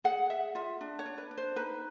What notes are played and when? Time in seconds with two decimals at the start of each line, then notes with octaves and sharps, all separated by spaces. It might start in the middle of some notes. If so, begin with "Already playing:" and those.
0.04 G#4 F#5
0.30 G#4 E5
0.55 F4 E5
0.81 D4
0.99 C#5
1.06 D4
1.18 B4
1.31 D4
1.37 C5
1.56 D#4 B4